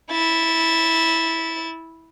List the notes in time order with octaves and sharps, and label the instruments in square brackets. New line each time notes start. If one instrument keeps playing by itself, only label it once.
[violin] E4 A6